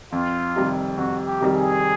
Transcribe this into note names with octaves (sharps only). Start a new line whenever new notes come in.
F2 F4
C3 D#3 G3
F2 F#4
G4
C3 D#3 G3
G#4